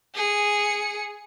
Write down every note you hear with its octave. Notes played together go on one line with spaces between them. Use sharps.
G#4 C#7